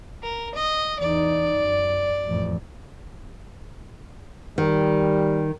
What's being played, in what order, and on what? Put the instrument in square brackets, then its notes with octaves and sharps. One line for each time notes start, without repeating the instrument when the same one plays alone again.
[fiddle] A#4
D#5
[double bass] E2 D#4 [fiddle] D5
[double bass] F#2
A1 F2
[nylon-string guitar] D#3 [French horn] G3